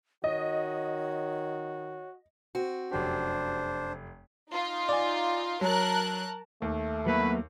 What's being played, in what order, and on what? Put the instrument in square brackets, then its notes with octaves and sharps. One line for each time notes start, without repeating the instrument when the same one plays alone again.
[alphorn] D#3 [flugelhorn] F#4 [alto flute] C#5 [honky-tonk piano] D#5
[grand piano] C4 [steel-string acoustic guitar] F#4
[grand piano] F1 F#2 G4 [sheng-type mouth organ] D4 C5
[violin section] D#4 F4
[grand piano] D5 G#5
[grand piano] F#3 [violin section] A#4 A5 F#6
[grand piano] D#2 [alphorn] A3
[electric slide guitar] F#3 A#3 B3 [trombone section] E4 F#4 B4